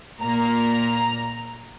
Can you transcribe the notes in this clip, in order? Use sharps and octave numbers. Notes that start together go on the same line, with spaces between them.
A#2 A#3 A#5